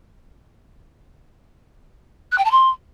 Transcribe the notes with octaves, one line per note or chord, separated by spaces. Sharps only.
F#6
G5
A5
C6